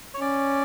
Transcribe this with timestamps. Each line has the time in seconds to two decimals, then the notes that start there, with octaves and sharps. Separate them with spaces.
0.14 C#5
0.20 C#4 D5